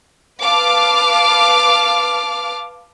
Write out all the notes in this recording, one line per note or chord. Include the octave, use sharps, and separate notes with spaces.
B4 F5 A5 D6 F6